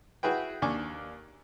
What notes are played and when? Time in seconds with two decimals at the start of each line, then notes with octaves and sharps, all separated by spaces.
0.23 E4 F#4 G#4 B4 G5
0.62 D#2 D4 G#5 C#6 D6